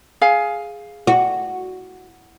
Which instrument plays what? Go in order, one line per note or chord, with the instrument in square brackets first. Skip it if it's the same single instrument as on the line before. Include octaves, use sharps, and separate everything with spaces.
[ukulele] G#4 F5 G#5
[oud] F#4